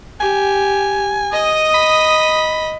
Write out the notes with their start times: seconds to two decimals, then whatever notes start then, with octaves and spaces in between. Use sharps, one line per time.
0.21 G4 G#5
1.33 D#5 D#6
1.74 B5